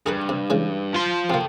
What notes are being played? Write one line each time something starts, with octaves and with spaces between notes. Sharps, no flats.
G2 G#4 A#4 B4
C3
C#3 E3 G#3
F3 C6
C3 A#3 A4 G5